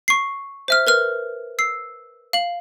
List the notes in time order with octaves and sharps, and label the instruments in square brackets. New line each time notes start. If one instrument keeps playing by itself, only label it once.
[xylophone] C#6 C7
C5 E5 F6
A#4 B4 F6
E6 C7
F5 F#7